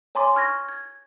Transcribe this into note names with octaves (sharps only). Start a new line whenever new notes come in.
C#5 G#5 A#5 C6 D6
C#6 F6 G#6 A#6
G#6